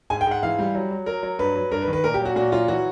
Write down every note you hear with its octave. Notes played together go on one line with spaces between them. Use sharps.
G#2 G#5
G5
G#2
F#5
E3 F5
G3
F#3
F#3
F#3 A#4
F#3
G2 B4
F#3
G2 A#4
B4
D#3
B4
A#2 A#4
G4
F#3
F#4
A#2 F#4
F#3 F4
E3 F#4